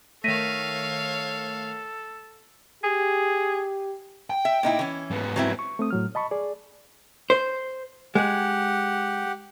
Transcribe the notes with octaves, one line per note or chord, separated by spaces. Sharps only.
D#3 A3 A4 C#5 F5 A#6 B6 D#7
G4 G#4
G5
E5
A#2 D#4 E4
E3 C#4
G#2 B3
F#3 C4 E4
C#6
A3 C4 D#6
A2 F#3 F6
D#5 A5 B5 C#6
G#4 D5
C5
G#3 G4 F#5